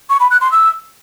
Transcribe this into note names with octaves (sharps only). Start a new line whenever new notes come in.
C#6
B5
F#6
C6
E6